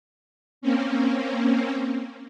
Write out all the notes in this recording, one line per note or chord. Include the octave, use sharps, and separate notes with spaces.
A#3 C4 C#4